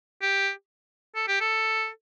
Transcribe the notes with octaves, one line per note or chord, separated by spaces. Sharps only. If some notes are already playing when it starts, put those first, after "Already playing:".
G4
A4
G4
A4